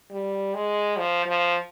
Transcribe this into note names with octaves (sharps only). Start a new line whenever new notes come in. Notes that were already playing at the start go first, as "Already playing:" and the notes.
G3
G#3
F3
F3